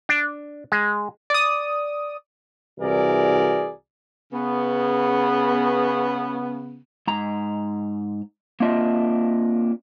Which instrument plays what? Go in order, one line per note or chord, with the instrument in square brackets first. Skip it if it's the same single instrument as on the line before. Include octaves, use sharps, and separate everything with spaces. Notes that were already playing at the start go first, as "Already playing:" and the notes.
[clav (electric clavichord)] D4
G#3
[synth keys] D5 D#6
[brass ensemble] C2 E3 F#4 G#4 A#4 D5
[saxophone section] C#3 B3
[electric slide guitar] G#2 A#5
A#3 C4 D4 F4 D#5 E5